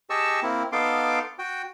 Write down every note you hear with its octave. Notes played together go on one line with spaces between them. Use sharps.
G4 G#4 D#5 A5 C#6 E6
A#3 C4 E4
B3 D#4 A4 F5 C6 D6
F#4 G5